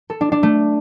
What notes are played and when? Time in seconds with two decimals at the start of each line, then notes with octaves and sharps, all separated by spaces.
0.10 A4
0.21 D4
0.32 D4
0.43 A3